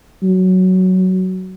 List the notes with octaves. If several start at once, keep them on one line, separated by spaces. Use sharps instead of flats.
F#3